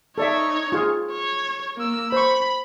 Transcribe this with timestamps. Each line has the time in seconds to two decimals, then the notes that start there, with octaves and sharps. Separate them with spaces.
0.18 D#4 A4 C#5 D5 E5
0.72 F4 G#4
1.11 C#5
1.77 A#3 E6
2.12 C5 B5 C#6